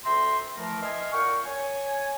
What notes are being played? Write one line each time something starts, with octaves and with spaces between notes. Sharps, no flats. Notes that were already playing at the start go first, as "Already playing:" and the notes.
D2 E5 G5 A#5 C6
E3 F3 A3 A#4
D#5 E5 G#5 C6 F6
A#2 A#4 F#5 G5 C#6
C#5 G#5